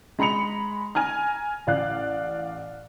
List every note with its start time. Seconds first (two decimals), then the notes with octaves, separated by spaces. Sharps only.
0.19 G#3 A#5 B5 C#7 F7
0.95 G#5 A#5 F6
1.67 A1 D5 F5 F#6